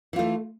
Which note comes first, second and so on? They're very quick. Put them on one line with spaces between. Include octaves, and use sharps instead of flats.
E3 F4 A3